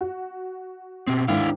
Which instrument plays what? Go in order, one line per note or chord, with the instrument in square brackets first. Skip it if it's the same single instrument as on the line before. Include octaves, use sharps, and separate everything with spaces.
[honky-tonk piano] F#4
[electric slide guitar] B2 C4
[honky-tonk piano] G#2 D#3 [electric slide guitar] D4 E4 F5